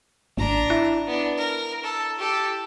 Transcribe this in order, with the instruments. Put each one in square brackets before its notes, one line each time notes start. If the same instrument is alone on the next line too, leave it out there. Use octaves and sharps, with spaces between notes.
[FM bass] G#1 [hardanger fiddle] D4 A#5
[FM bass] E4
[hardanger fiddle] B3 D4
A#4
A4
G4 A4